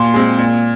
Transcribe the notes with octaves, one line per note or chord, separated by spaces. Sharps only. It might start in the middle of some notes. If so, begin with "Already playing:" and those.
Already playing: A#2 C6
G#3 C4
A#2